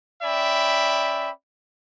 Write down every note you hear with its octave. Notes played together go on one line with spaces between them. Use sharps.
C#4 D5 E5 G5 B5